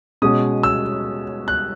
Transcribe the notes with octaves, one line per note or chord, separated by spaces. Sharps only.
B2 G#3 C#4 D#6
E6
F#6